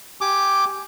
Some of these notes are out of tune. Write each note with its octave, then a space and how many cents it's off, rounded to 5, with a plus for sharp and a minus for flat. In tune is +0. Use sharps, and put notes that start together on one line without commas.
G4 +0 G#5 +0 D6 +0